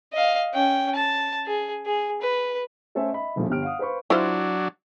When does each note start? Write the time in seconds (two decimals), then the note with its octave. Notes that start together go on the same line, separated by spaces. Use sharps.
0.13 D#5 F5
0.53 C#4 G5
0.95 A5
1.46 G#4
1.86 G#4
2.22 B4
2.95 A3 C#4 A4 C5 E5 G#5
3.12 D#5 E5 B5
3.36 E1 A#1 F3 A3
3.50 G1 G4 F6 D7
3.63 F5 F#5 D#6
3.79 B4 C5 F5 B5 C#6
4.10 F#3 D4 E4 F4 C5